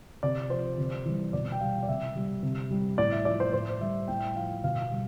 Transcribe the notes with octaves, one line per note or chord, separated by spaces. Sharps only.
C3 D5
F3 C5
C3
E3 G3
B2 D5
G5
G3 F5
D5
C3 E5
G3
C3
G3
A2 D5
E5
F3 D5
C5
A2 C5
G3 E5
A2 G5
F3 F5
B2 F5
G3